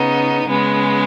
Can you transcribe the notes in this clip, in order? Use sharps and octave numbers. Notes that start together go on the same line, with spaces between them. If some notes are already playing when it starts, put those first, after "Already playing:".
Already playing: C#3 B3 D#4
C#3 G#3 B3